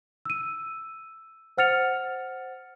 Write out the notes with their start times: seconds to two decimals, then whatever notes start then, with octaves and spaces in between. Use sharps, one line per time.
0.25 E6 D#7
1.57 C5 F#5 F6 A6 C#7 F7